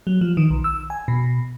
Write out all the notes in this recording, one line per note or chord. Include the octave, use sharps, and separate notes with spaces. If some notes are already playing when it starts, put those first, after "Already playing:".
F#3
F3
D#3
B1
E6
G#5
B2